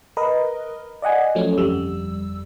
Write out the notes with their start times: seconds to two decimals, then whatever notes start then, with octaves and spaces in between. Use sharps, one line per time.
0.17 A#4 B4 D#5
1.02 D5 D#5 F#5 G#5
1.35 F3 F#3 A3 C#4
1.58 G1 F2 G3 E6